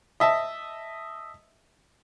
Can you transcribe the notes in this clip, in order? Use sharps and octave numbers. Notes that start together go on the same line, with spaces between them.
D#5 E5 A5